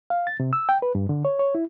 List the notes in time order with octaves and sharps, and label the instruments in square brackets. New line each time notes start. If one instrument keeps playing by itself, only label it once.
[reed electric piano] F5
A6
C3
E6
G5
B4
G2
D3
C#5
C#5
E4